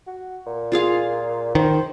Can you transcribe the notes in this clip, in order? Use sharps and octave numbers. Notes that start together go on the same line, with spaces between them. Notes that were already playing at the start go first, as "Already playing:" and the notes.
F#4
A#2
F4 G#4 F5
D#3 C5